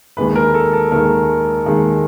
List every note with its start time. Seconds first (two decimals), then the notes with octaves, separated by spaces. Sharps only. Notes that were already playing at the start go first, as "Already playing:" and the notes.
0.17 D#2 D#3 G#3 B4
0.36 A#4
0.54 A4
0.73 A4
0.92 D#2 D#3 G#3 A#4
1.66 D#2 D#3 G#3